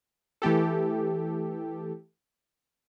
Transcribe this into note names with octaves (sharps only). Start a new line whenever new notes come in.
E3 A3 G4 A4